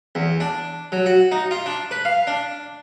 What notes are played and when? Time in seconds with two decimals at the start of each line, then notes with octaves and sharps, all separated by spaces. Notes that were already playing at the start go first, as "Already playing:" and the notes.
0.15 E2
0.40 D4
0.92 F#3
1.06 F#4
1.32 D#4
1.51 F4
1.66 D4
1.91 B4
2.05 F5
2.27 D4